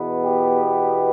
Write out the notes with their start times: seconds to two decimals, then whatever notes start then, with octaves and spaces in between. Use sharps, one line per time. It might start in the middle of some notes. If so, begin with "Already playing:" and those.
Already playing: E2 B2 B3
0.25 G4